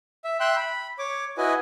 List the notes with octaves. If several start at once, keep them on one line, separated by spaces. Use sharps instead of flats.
E5
E5 G5 C6 F#6
B5
C#5 D6
E4 F#4 B4 D#5 G#5